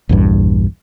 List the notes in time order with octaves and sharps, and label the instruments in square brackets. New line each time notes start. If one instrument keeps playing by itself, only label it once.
[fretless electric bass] A#1 E2 G2